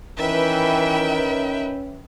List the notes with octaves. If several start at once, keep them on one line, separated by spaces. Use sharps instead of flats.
D#3 E3 C#4 B4 E5 G5